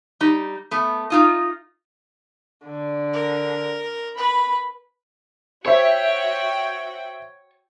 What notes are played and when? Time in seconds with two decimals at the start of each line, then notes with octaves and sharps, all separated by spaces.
0.21 G3 D#4
0.71 A3 B3
1.10 D#4 F4 D#5
2.66 D3
3.14 A#4
4.18 B4 B5
5.66 F#4 C5 C#5 E5 G5